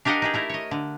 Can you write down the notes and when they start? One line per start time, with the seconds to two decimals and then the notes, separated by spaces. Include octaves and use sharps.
0.05 D4 G4 A#4 D#5 F5 F#5
0.22 D#4 G4 G#4
0.34 A3 E4 A#4
0.49 C#5 D#5
0.71 D3